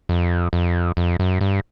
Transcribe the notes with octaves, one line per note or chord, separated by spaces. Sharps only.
F2
F2
F2
F#2
G2